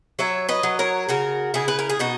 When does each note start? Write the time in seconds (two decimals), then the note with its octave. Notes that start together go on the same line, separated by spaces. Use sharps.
0.19 F#3 C#5 E5
0.49 B4 D#5
0.63 F#3
0.79 A#4 C#5
1.09 C#3 F#4 A#4
1.54 C#3 E4 G#4
1.68 B4
1.79 A#4
1.89 G#4
1.99 B2 D#4 F#4